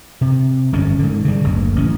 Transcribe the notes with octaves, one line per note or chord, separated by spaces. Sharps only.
C3
G1 F2 C#4
G#2 D3
C#3 G3
F#1 D2
A1 C#4